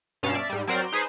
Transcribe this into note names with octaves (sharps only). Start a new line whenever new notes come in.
G2 B2 C#4 F5 A5
D5 E5
G#2 G3
F#3 C4 A#4 C5 D5
C6 D7
D#4 G#4 B4 C5